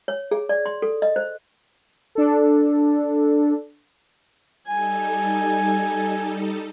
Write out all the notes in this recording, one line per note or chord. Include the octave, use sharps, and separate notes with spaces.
C#5
G#4
D5
C6
A4
D#5
C5
D4 A4
G3 D#4 A4 G#5